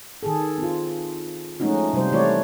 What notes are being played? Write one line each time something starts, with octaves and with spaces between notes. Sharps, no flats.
D#3 G#4 A4
C4 F4
F3 G#3 A3 C#4 D#4 F#4
C3 G3 F#4 C5
E3 A3 E4 F#4 C#5 D5